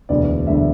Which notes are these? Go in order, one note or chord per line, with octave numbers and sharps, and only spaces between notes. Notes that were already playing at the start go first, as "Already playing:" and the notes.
E1 D2 D3 B3 D5
E1 D2 D3 B3 E5